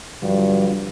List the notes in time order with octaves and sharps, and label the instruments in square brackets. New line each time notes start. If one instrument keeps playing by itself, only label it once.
[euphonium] G2 [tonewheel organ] D3 F3 F#3